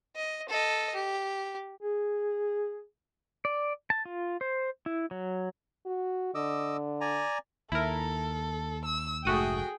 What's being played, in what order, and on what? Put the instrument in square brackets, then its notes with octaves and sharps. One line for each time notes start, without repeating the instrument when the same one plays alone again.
[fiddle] D#5
A4 D#5
G4
[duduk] G#4
[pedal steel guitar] D5
A5
F4
C5
E4
F#3
[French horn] F#4
[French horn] D3 [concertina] D#5 D6 E6
[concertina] D5 G#5 A#5
[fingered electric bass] D#2 [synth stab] E4 A#4 [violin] A4
[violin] E6
[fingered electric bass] F1 G#2 [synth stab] A3 F#4 D#6 [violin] G#4 G5